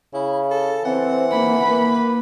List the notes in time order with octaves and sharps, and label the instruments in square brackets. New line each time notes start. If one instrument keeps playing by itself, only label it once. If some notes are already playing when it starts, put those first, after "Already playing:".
[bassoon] C#3 [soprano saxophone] E4
[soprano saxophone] A4
[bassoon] E3 [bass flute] C4 [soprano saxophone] F#5
[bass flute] A#3 [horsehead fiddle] B5
[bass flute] A#3 [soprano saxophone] B4